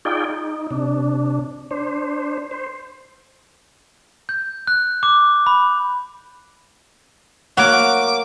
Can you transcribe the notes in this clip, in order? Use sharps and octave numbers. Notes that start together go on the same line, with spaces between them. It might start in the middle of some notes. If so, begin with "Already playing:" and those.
D#4 F4 G#4 D5 G5
D#4
C3 D4
D4 C5
C5
G6
F#6
D6
B5
F#3 A#3 F#4 D6 F6